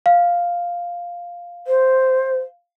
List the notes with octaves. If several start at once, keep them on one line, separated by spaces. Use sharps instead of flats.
F5
C5